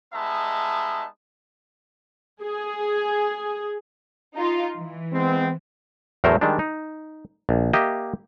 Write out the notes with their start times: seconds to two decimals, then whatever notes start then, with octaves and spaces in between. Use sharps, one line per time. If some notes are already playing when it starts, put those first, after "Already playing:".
0.14 G3 G#3 B3 D#4 E5 A5
2.42 G#4
4.36 D#4 F4
4.77 E3
5.13 G#3 B3 C4
6.24 E2 A2 F#3 A3 A#4 C5
6.41 D#3 G3 G#3 D4
6.59 D#4
7.49 A#1
7.73 A#3 G4 D#5 E5